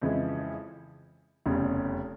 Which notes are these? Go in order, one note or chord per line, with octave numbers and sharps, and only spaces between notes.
F2 C#3 E3 G#3 E4
F1 E2 C#3 G3 C#4